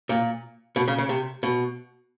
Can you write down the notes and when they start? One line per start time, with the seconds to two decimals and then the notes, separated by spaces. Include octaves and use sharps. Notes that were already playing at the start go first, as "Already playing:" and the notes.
0.09 A#2
0.76 B2
0.88 C#3
0.98 C#3
1.09 C3
1.43 B2